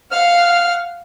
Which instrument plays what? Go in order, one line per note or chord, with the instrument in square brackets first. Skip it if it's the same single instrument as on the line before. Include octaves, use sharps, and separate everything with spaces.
[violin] F5 F#5 [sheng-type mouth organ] F6